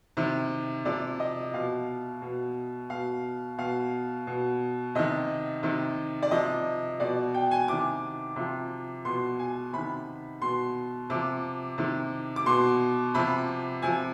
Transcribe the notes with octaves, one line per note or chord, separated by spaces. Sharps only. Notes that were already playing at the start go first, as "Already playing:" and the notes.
C3 D#3
C3 F3 D5
D#5
B2 F5
B2
B2 F5
B2 F5
B2
C3 D#3 D#5
C3 D#3
D5
C3 F3 D#5
B2 D5
G5
G#5
C3 D#3 D6
C3 F3
B2 C6
G#5
C3 D#3 B5
B2 C6
C3 F3 D6
C3 D#3
D6
B2 C6
C3 F3 B5
C3 F3 G#5